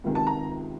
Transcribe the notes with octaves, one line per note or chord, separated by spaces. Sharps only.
C#2 C3 D#3 G#3
A5
A#5